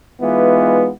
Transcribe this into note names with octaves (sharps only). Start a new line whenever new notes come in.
E3 G#3 B3 D#4 F4